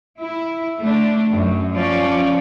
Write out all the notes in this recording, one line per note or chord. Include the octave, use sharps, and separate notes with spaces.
E4
A3 D4
F#2
F3 C#4 D5